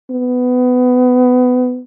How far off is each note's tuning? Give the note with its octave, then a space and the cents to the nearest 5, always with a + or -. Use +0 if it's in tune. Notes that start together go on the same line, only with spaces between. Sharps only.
B3 +20